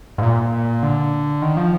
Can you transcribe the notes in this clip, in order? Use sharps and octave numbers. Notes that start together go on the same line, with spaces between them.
G#2
A#2
D3
D#3
F3